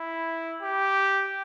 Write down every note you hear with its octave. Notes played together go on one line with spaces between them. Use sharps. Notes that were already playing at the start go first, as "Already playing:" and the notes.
Already playing: E4
G4